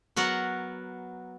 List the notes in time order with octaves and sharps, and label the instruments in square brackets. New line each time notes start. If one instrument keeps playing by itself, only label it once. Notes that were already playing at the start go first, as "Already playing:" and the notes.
[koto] F#3 B3 A#4 F#5